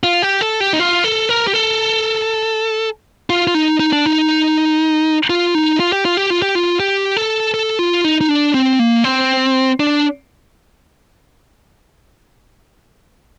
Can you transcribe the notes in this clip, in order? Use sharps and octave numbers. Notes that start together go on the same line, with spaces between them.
F4
G4
A4
G4
D#4
F4
A4
A#4
G4
A4
F4
F4
D#4
D#4
D4
D#4
F4
D#4
F4
G4
F4
G4
F4
G4
F4
G4
A4
A4
F4
D#4
D#4
D4
C4
A#3
C4
D4